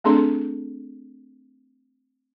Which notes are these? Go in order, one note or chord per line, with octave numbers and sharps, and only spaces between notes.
A3 C4 D4 G#4 A4 C6